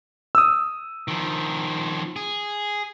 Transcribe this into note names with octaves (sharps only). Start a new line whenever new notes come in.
D#6 E6
D#3 F3
G#4